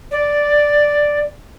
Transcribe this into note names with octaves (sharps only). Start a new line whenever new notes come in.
D5